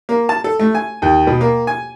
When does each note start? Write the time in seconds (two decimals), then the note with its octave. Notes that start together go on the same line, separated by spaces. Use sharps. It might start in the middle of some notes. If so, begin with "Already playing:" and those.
0.09 A#3
0.29 A5
0.44 A4
0.59 A3
0.75 G#5
1.02 D#2
1.27 B2
1.41 A#3
1.67 G#5